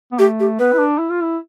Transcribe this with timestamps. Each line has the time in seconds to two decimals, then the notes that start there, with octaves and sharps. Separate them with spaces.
0.12 B3
0.19 A3 G4
0.40 G4
0.59 B3 B4
0.73 E4
0.79 D4
0.99 E4
1.10 F4
1.22 E4